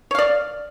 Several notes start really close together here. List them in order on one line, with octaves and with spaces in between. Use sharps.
C#5 F5 D5